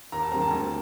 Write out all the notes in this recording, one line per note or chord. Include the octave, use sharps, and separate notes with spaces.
D#2 A#5
A5
D#3 G3 C4 A#5
A5
D2